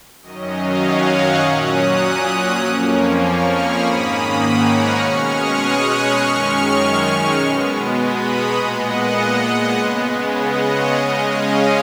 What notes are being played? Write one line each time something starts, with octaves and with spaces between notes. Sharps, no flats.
F#2 D#3 F#3 C#4 D#5
C#5 F5
D#5 F#5
C#6 F6
A#2 F#3 C#4 D#6 F#6
F2 F3 A#3 C#4
C#6 F6
B5 D#6
G#2 D#3 A#3 C#4
F#5 A#5
C#6 F6
B2 G#3 C#4 C#6 F6
D#6 F#6
B5 D#6
F#2 D#3 G#3 C#4 C#6 F6
B2 G#3 B3
B5 D#6
A#5 C#6
A#2 G#3 B3 D#5 F#5
C#3 G#3 B3
D#5 F#5
C#5
C#3 G#3 C#4 D#5
C#5 F5